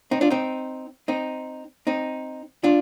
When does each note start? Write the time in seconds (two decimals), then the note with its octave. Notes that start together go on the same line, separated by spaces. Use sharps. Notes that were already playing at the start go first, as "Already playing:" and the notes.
0.11 C4 D#4
0.21 D4 F4
0.30 C4 D#4
1.08 C4 D#4
1.87 C4 D#4
2.64 D4 F4